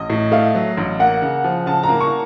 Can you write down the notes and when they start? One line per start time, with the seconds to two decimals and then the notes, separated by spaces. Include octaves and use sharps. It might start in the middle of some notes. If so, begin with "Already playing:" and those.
Already playing: A1 D#5
0.10 A2
0.32 A3 F5
0.55 F#3
0.77 A1
0.99 A#3 F#5
1.22 C#3
1.44 F3
1.66 C#3 A5
1.83 A#5
1.89 A#3
2.00 C#6